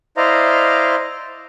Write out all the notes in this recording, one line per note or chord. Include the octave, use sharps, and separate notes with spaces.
E4 C5 D5 D#5 F5 A#5